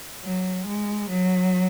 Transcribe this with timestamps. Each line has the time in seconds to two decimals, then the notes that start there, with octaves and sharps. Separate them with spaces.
0.23 F#3
0.66 G#3
1.09 F#3